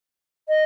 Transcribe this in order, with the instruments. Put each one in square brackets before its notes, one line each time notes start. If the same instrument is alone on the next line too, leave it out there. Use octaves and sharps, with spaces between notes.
[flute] D#5